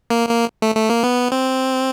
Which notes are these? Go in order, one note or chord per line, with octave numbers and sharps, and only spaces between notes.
A#3
A#3
A3
A3
A#3
B3
C4